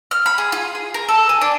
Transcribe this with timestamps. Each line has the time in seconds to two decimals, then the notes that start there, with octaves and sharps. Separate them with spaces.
0.11 F6
0.26 B5
0.38 G#4
0.52 F4
0.75 G#4
0.94 A#4
1.09 A4
1.29 G#5
1.41 D4